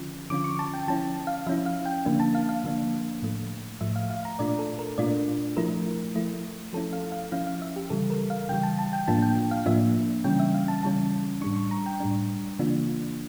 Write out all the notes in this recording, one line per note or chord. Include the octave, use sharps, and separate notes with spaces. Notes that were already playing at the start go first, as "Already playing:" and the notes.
Already playing: D3 F3 C#4 F4
D3 F3 C#4 F4 D6
C#6
A5
G5
F3 C#4 E4 A5
F5
F3 C#4 E4 E5
F5
G5
D3 F3 A#3 D4
A5
F5
F5
D3 F3 A#3 D4
A2 F3 A3
A2 F3 A3 E5
F5
F5
A#5
A#2 A3 D4 F4 D5
A4
A#4
A#2 A3 D4 F4 D5
F3 A3 E4 A#4
F3 A3 E4
F3 C#4 E4 A4
F5
F5
F3 C#4 E4 F5
F5
E5
G4
C#3 E3 G3 A4
A#4
F5
C#3 E3 G3 G5
A5
A5
G5
A2 F3 A#3 D4 F4 A5
G5
F5
A2 F3 A#3 D4 F4 E5
C#3 E3 G3 C#4 G5
E5
F5
A5
C#3 E3 G3 C#4 A5
A2 G3 D4 C#6
C#6
A#5
G5
A2 G3 D4
C#3 E3 A#3 D4 F4